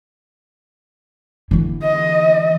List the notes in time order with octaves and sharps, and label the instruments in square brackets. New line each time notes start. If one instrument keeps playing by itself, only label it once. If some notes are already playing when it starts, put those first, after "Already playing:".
[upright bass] D3 E3
[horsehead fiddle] D#5